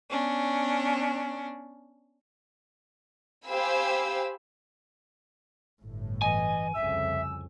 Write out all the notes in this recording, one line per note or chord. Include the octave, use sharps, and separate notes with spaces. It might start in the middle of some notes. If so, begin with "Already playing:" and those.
B3 C#4 D4
G4 C5 F5 G#5 B5 E6
G1 A2
E3 D#5 G#5
C2 F2 C#3 E5 E6